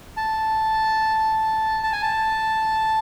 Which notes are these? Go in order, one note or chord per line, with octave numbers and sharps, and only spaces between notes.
A5
A5
G#5
A5